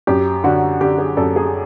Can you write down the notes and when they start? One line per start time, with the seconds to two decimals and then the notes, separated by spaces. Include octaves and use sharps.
0.07 F#2 G4
0.44 D3 F#4
0.81 D3 G4
0.98 G#4
1.17 F#2 A4
1.36 G#4